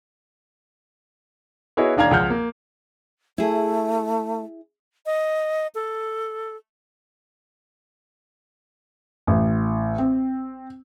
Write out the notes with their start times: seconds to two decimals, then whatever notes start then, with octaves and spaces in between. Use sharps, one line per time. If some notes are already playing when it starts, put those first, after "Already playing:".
1.77 B3 E4 F#4 G#4 C#5 D#5
1.96 E1 D#2 D4 F5 A#5 G#6
2.11 C#2 F3 F#5 F6 G6
2.30 A#3
3.38 A3 E4 G#4
5.06 D#5
5.75 A4
9.27 A1
9.98 C4